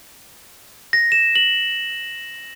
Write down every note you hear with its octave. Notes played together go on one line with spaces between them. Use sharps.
A#6
E7
F#7